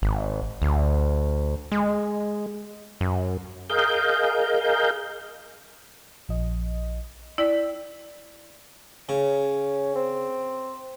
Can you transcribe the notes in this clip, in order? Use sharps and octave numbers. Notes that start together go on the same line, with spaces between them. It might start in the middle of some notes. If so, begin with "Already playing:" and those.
G#1
D2
G#3
F#2
G#4 A#4 D#5 F5 G6
A#1 F3 D#5
E4 D5 G5 E6 B6
C#3 C#4
C4